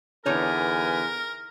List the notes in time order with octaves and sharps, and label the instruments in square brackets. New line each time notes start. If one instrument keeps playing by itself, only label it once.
[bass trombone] E2 [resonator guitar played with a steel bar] D3 D#4 C#5 [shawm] A#4 [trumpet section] B4 G#5